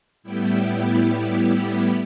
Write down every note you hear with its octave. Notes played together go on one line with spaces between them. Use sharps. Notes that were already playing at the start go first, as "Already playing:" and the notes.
A2 G3 B3 E4 G4